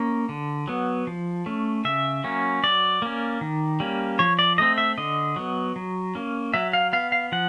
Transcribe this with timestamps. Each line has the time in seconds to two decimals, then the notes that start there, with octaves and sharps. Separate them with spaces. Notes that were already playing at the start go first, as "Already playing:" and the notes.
Already playing: A#3 C#4
0.29 D3
0.68 F#3 B3
1.07 F3
1.46 A3 C#4
1.85 C#3 E5
2.24 F#3 A#3 C#4
2.63 F#3 D5
3.02 A#3 C#4
3.41 D#3
3.80 G3 A#3 C#4
4.19 F3 C#5
4.39 D5
4.58 A3 C4 D#5
4.78 E5
4.98 D3 D#5
5.36 F#3 B3
5.76 F#3
6.15 A#3 C#4
6.54 F#3 E5
6.73 F5
6.93 B3 F5
7.12 F5
7.32 F3 F#5